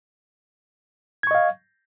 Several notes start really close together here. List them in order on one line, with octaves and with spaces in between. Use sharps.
G#6 C#6 D#5 F5